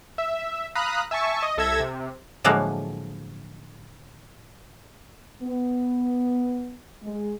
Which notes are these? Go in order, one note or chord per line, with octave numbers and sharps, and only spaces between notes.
E5
F5 A#5 B5 D#6 F#6
E5 G#5 A5 C#6
D#5
C2 A4 E5 E6 G#6 A#6
C3
A2 D3 F3 F#3 G#3 A#3
B3
G#3